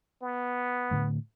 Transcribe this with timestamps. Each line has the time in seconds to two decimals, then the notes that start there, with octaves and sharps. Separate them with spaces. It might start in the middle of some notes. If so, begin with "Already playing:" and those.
0.22 B3
0.91 A2 D3 A3